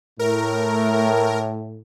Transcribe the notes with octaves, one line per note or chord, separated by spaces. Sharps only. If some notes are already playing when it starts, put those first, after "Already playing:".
A2 A3 A#4